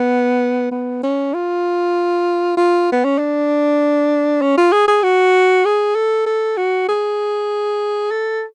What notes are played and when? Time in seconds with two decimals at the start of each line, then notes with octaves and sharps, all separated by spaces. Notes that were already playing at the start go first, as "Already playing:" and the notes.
Already playing: B3
0.71 B3
1.03 C#4
1.34 F4
2.57 F4
2.92 B3
3.05 C#4
3.19 D4
4.42 C#4
4.58 F4
4.72 G#4
4.88 G#4
5.03 F#4
5.65 G#4
5.95 A4
6.26 A4
6.57 F#4
6.89 G#4
8.11 A4